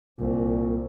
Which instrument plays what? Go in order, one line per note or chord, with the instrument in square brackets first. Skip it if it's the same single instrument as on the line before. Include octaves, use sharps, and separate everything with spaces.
[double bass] C2 [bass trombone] A#2